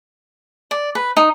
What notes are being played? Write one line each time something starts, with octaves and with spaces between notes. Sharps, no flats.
D5
B4
D#4